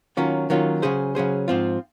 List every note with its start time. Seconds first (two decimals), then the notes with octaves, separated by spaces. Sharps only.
0.17 D#3 F#3 A#3 C#4 F4
0.50 D#3 F#3 A#3 C#4 F4
0.82 C#3 F#3 C#4 G#4 C5
1.15 C#3 F#3 C#4 G#4 C5
1.48 G#2 F3 C4 F4